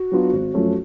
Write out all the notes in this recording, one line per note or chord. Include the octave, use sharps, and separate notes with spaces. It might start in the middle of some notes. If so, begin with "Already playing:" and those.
Already playing: F#4
F#3 B3 D4 F4
G#1
F#2 F3 A3 C#4